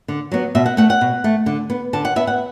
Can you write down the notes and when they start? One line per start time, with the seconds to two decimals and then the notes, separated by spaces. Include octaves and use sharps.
0.08 D3
0.32 F#3 B3
0.55 B2 E5
0.66 F#5
0.77 A3 F#5
0.90 F#5
1.01 B2
1.24 A3
1.46 D3
1.70 B3
1.93 D3 A5
2.05 F#5
2.16 B3 E5
2.27 F#5